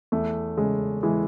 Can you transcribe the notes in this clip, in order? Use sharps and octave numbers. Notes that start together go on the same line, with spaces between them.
E2 A3
C#3 G#3
E3 G#3